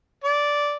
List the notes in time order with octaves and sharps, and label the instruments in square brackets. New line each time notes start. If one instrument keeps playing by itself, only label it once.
[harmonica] D5